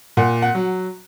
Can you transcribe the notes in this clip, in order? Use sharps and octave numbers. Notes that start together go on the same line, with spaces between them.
A#2 F#5
F#5
F#3